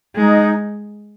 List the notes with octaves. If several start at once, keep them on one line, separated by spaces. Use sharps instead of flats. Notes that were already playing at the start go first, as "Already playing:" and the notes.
G#3 D#4